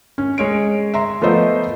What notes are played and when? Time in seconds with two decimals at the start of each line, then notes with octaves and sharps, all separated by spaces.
0.18 C#4
0.38 G#3 C#5 D7
0.94 E5 A#5 C6
1.22 F3 A3 B3 B4 C5 D#5